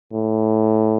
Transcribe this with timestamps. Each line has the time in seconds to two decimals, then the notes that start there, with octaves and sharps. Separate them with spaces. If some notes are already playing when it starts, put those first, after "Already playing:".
0.13 A2